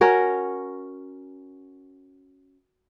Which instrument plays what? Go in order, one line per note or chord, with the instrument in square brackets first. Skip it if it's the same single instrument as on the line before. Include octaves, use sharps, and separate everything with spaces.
[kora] C#4 F#4 A#4 C#5